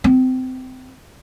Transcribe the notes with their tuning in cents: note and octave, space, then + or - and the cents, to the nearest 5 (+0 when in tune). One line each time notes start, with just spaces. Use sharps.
C4 -25